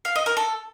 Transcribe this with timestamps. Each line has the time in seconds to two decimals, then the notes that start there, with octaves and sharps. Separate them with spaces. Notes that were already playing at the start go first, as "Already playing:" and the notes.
0.05 F5
0.16 D#5
0.26 A#4
0.37 A4